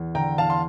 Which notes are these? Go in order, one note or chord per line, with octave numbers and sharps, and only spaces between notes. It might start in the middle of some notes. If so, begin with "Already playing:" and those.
Already playing: E2
D3 G5 A#5
E2 F5 A5
C6